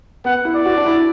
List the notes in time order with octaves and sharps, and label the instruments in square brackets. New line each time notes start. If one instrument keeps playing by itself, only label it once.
[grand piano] B3 [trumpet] F#5
[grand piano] E4
[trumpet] D5
[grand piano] F#4
D4
E4